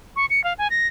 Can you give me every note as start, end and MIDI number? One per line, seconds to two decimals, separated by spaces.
0.16 0.26 85
0.30 0.43 97
0.44 0.53 77
0.58 0.68 80
0.70 0.87 94